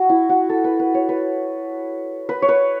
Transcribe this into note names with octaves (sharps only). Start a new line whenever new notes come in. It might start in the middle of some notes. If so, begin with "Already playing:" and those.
Already playing: F#4
E4
F#4
A4
B4
B4
C#5
B4
B4
C#5
B4